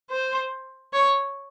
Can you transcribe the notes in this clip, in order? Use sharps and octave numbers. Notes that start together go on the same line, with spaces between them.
C5
C#5